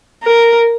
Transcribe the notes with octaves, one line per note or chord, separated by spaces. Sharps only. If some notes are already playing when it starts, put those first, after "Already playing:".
A#4